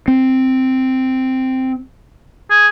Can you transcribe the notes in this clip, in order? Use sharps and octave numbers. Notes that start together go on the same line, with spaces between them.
C4
G#4